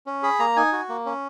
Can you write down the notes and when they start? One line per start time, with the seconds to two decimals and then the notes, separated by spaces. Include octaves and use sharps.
0.07 C#4
0.23 G#4 B5
0.39 A#3 A#5
0.56 D#4 G#5
0.73 F#4
0.89 A#3
1.06 C#4